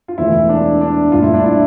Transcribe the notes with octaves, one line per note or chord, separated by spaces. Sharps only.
F4
E1 E2 E3 A3 E4
D4
D4
C2 A#2 A3 F4
E4
D4
E4